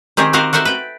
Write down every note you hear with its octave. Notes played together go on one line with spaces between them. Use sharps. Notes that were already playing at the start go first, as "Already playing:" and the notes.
D#3 C4 G4 G#4
C4 F#4 G4 A#4 D#5 F5
F#4 A4 A#4 C5 E5
B4 G5